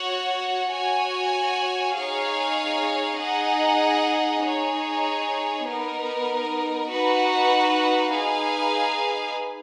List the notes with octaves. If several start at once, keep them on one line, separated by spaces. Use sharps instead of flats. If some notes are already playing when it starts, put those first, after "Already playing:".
Already playing: F#4 C#5 F#5
F#4 C#5 G#5
D#4 G#4 C#5 F5
D#4 G#4 D#5 F#5
D#4 G#4 C#5
B3 D#4 A#4
D#4 F#4 B4 F#5
D#4 G#4 B4 F5 G#5